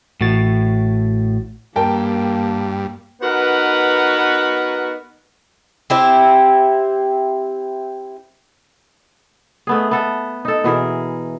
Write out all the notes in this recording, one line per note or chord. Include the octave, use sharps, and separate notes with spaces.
A1 A2 F#4 A6
G2 A#3 A#4 G5 A5
B3 D#4 F#4 A#4 B4
C4 E4 G4
A3 B3 G#4
B3 A4
D#4 A4
B2 E3 G#4 A#4